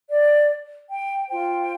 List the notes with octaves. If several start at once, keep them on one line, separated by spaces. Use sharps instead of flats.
D5
G5
F4 C5 G5